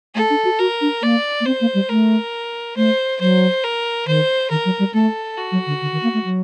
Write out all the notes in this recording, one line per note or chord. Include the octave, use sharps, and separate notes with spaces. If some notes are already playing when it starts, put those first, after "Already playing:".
A3 A4
D4
F#4
F#4 A#4
D4
A#3 D5
A#3
C4 C5
A#3
G3
A3 A#4
A3 C5
F#3 C5
A#4
D#3 C5
D#3 A#4
F#3
G3
A3 A4
F#4
F#3
D3
D3
D#3
A#3
A3
F#3